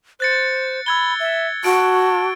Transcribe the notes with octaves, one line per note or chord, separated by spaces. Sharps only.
C5 F#6 A6 C#7
B5 E6 G#6 G7
E5
F#4 A5 D7